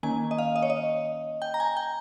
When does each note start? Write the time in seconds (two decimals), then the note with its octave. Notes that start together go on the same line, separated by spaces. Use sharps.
0.03 D#3 A#3 C#4 G#5
0.31 D#5
0.38 F5
0.56 D#5
0.62 C#5
0.70 D#5
1.42 G5
1.54 A#5
1.60 G#5
1.77 G5